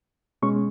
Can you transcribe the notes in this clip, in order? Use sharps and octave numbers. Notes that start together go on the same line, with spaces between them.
B2 G#3 C#4 C#6